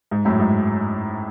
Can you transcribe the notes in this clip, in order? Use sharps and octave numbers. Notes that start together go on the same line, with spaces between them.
G#2
F#2 A2
G#2